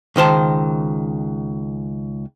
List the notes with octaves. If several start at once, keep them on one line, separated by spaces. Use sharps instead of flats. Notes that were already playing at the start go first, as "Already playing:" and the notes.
C#2 D#3 C5 A5